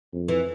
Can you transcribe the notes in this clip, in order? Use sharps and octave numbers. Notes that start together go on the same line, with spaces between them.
F2
E3